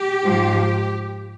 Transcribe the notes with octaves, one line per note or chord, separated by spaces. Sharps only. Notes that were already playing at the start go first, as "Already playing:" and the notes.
Already playing: G4
G#2 F3 G#3